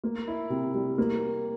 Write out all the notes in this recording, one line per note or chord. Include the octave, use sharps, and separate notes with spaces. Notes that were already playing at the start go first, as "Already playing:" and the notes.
A#3
E4
C3
G3
A#3